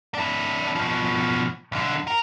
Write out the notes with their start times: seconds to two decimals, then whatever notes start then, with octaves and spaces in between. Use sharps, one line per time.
0.14 D4 E4
0.76 B2 F3
1.72 B1 D3
2.07 A#4